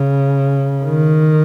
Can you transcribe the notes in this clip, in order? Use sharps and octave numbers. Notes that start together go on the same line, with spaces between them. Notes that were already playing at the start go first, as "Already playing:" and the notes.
Already playing: C#3
D#3